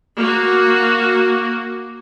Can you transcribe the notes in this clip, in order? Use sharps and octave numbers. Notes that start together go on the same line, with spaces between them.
A#3 F#4